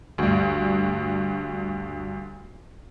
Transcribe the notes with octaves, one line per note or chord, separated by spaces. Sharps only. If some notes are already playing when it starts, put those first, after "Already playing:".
D2 G2